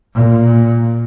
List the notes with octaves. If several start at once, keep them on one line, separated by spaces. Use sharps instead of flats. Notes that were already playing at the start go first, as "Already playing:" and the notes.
A#2